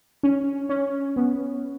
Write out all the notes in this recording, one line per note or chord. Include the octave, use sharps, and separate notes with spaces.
C#4
C#4
B3